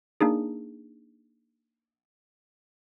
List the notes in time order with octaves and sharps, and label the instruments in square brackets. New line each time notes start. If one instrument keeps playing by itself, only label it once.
[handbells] A#3 D4 D#4 G#4